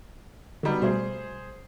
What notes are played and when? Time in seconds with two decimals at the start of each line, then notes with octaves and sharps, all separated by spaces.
0.63 D3 F#3 G3 B3 D#4
0.82 B2 G3 A3 G#4 C5